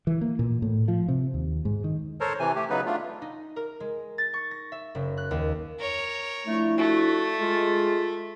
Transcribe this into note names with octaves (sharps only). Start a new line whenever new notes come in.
E3
A#3
A#2
A2
F3
C3
D#2
G#2
D#3
A4 A#4 C5 C#5
C3 E3 G#5
A3 G4
C#3 F#3 B3 D#4 B4
A3 D4 F4
D#4
A#4
G#3
A6
C#6
A#6
E5
F#1
F#6
D#2
A#4 C#5
F3 A3 D4 E4
A3 F#4
G#3 F4